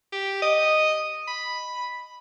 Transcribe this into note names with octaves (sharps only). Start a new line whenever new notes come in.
G4
D#5
B5